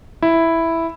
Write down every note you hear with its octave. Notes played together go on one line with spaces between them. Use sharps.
E4